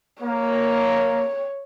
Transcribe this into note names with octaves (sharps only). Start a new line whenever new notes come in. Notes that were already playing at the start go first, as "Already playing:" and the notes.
A#3 C#5